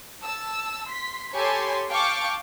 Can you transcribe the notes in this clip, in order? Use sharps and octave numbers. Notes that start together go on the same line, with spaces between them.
A5 E6
C6 B6
G4 A4 C#5 G#5 B5 C6
F5 G5 A5 C#6 D6